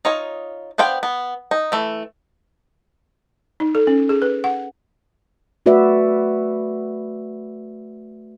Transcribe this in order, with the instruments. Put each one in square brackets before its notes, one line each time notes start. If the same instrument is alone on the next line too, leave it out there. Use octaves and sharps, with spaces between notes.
[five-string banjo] D#4 F4 C#5
B3 D4 C5 F5 G5
B3
D#4
E3 A3
[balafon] D#4
A4
C#4
G#4
B4
F#5
[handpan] A3 F#4 B4 D5 E5